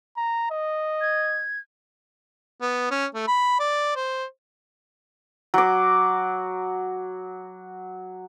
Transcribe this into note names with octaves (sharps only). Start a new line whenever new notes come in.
A#5
D#5
G#6
B3
C#4
A3
B5
D5
C5
F#3 D6